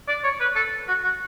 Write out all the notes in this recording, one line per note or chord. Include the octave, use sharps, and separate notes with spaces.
D5
C#5
B4
A4
F#4
F#4